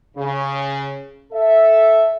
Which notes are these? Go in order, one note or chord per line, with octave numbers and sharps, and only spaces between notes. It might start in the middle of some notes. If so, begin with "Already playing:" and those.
C#3
A4 E5